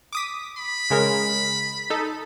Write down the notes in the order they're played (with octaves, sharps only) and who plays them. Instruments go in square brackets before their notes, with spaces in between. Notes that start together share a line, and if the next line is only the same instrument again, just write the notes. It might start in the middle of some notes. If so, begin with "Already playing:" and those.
[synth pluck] D6 D#6 B6
[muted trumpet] B5
[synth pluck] C#3 G#3 A#4
D#4 A4